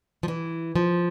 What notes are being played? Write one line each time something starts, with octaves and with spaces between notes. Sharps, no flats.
F3
E3
F3